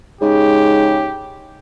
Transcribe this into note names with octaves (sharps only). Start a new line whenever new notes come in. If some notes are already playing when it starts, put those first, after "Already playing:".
G#2 C#3 G4